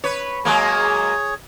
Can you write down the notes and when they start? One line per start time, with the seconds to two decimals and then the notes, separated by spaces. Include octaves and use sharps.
0.04 B4 C#5
0.45 F#3 G#3 A#3 G#4 C#5